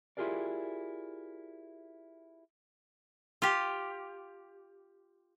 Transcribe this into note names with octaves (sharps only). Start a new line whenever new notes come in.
E4 F4 G4 G#4 A#4 D5
F4 G4